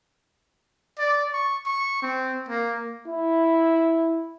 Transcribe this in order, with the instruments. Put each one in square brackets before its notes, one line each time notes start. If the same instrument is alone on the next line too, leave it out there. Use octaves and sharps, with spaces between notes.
[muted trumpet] D5
C#6
C#6
C4
A#3
[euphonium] E4